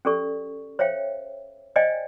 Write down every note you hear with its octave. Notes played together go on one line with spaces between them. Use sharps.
C#4 G4 A4 D5 C#6
C5 C#5 E5 F5 G5
C5 D5 D#5 F5 G5 G#5